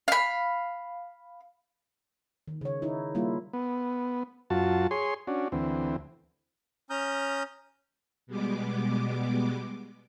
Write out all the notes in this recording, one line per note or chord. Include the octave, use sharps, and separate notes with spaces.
F5 B5
D#3
C#3 C#5
D#4 E4
G3 A#3 E4 F4
B3
F#2 F4 F#4 A5
G#4 C#5 C6
C#4 D4 F#4
D2 E3 C4
C#4 A#5 D#6 F6 G6
B2 G3 G#3 B3 D6